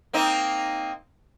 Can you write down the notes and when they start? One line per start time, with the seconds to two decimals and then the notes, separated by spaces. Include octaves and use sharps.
0.13 A#3 C4 D#4